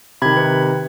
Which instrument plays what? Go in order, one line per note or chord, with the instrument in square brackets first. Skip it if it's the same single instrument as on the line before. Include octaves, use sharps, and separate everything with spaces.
[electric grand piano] C3 D#3 [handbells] B5 G#6
[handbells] B4